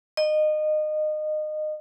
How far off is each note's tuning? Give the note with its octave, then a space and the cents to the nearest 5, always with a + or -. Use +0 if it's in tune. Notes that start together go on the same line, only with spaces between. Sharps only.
D#5 -25